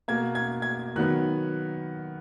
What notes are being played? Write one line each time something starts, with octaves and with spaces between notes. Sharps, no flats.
B2 A#3 G#6
G#6
G#6
D#3 F#3 B3 F#6